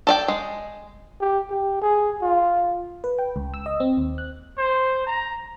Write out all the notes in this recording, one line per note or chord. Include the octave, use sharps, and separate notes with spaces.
A4 D5 G5
G#3
G4
G4
G#4
F4
B4
G5
C#2
E6
D#5
C4
D#2
F#6
C5
A#5